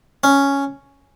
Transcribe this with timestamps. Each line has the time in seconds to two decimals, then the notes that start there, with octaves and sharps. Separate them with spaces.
0.24 C#4